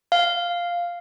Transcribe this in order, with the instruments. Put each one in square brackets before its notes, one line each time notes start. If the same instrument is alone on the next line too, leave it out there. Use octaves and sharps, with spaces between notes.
[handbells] F5